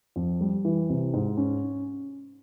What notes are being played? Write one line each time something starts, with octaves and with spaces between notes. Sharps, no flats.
F2
G3
E3
C3
G#2
C#4